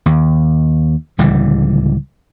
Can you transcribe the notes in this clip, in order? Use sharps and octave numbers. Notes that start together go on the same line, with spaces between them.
D#2
D1 C#2 E3 G3